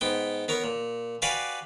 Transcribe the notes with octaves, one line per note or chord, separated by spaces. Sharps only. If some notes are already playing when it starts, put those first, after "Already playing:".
G#2 B3 G5
B3 A#4 C#5
A#2
F#4 G4 B4 D5 F5 G#5